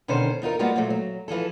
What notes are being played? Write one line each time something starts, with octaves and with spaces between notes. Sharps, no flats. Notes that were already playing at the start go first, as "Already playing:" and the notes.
B2 D3 D#3 C#4 C5
E2 D#4 F4 A#4
G3 G#3 A#3 B3 F4 F#4
A#2 F3 F#3 A3
F#3
E3 F3 G#4 A4